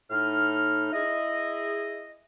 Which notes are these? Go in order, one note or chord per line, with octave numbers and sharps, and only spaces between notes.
A2 D#4 F6
E4 G#4 D#5